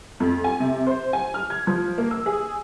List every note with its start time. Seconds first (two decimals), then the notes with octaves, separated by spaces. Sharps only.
0.20 F2
0.44 G#5
0.60 C3
0.87 C5
1.13 G#5
1.34 F6
1.50 G#6
1.67 F3
1.98 A#3
2.11 E6
2.26 G#4